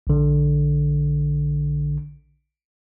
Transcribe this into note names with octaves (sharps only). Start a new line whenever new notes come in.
A#1 D3